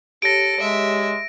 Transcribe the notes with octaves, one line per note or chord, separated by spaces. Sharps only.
G4 A4 C#5 A#6 D7
G#3 E5